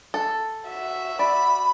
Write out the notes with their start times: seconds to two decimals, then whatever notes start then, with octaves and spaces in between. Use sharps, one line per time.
0.14 A4
0.68 F#4 E5
1.19 D5 B5